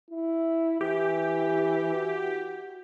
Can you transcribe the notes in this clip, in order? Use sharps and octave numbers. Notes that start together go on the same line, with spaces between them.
E4
E3 G4
F#4